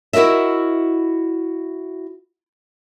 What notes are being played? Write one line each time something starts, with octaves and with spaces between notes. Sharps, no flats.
E4 F#4 A#4 D#5 E5